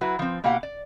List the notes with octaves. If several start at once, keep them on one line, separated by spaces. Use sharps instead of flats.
F#3 E4 F#4 B4
F3 C4
B2 A#3 E4 G4 F5 F#5
D5